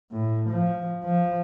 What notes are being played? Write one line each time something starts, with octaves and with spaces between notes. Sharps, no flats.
A2
F3
F3